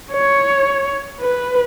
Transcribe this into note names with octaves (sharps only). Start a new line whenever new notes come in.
C#5
B4